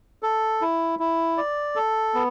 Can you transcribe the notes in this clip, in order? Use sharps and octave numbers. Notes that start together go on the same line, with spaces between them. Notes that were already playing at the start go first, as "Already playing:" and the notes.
A4
E4
E4
D5
A4
B3